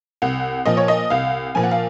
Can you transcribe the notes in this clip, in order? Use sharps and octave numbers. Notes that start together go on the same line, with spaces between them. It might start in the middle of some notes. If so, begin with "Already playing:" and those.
C2 F#5
A#2 F3 D#5
C#5
D#5
C2 F5
A#2 F3 G#5
F#5
F5